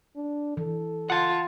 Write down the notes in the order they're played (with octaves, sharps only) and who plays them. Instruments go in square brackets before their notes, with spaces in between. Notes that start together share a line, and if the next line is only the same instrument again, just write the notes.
[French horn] D4
[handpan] E3 [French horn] A4
[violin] F4 [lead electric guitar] F#5 A5